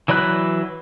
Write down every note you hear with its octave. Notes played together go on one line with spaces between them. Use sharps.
E3 F#3 D5 B5 F#6